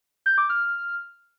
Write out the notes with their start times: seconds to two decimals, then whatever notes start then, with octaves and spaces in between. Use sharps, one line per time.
0.26 G6
0.38 D6
0.49 F6